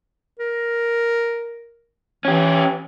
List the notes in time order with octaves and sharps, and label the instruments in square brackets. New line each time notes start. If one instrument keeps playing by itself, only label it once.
[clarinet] A#4
[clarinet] E3 [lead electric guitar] C#4 G4